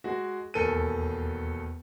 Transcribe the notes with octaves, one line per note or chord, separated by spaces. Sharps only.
G#3 F#4
E1 D#2 A4 A#4 G#5 D#7